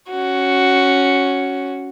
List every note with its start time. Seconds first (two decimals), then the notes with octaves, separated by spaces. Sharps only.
0.11 C#4 F#4